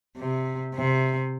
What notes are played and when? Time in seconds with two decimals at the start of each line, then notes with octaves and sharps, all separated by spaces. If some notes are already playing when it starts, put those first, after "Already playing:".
0.18 C3
0.75 C3